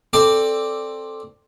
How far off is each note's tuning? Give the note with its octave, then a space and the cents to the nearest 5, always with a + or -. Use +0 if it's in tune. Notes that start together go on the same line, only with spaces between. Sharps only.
C4 +10 A4 +0 D5 +0